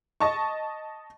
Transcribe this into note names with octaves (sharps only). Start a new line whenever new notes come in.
D#5 A5 C#6